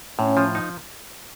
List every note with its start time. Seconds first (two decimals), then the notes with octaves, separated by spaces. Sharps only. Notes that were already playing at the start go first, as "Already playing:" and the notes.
0.19 A2 C#4
0.37 F3
0.55 D#4